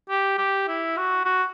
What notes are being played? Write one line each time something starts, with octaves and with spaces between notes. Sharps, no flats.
G4
G4
E4
F#4
F#4